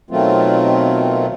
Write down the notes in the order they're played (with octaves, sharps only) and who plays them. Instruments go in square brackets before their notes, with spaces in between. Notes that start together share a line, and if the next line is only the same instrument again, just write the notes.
[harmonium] B2 D#3 F#3 A3 C4 F4